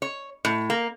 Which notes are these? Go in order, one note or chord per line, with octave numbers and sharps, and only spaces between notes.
C#5
A2
A#3